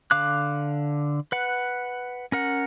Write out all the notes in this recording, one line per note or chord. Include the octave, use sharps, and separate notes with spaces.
D3 F5 D6 F#6
B4 F#5
C#4 A#4 F#5